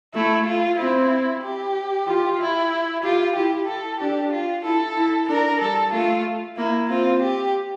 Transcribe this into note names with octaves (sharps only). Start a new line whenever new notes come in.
A3 E4
F4
C4 E4
G4
F4
E4
F4 G4
E4 G4
A4
D4 G4
F4
E4 A4
E4
D4 A#4
G3 A4
A3 F4
A#3 E4
C4 F4
G4